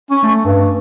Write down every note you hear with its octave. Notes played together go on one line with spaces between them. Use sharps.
C#4
A3
G2